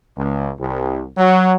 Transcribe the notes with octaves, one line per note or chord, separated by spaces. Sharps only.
C#2
C2
F#3